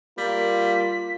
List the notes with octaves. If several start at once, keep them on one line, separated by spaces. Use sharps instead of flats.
G3 A#3 F4 B6